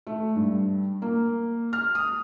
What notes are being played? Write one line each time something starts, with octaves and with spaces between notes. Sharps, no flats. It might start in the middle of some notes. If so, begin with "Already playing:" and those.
A3
G2
A#3
F6
D#6